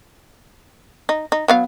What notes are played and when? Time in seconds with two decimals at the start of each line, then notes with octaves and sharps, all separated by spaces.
1.09 D#4
1.32 D#4
1.48 F#3 B3 F5